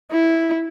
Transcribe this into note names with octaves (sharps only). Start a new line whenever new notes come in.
E4